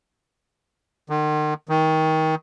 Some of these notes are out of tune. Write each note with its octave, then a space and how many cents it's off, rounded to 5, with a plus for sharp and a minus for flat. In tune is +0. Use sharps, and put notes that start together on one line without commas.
D#3 -40
D#3 +25